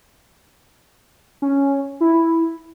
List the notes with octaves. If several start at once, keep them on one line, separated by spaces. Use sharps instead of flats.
C#4
E4